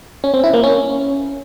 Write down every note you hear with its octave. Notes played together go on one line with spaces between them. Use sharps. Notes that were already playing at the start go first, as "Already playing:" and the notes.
C#4
C4
E4
A#3
C#4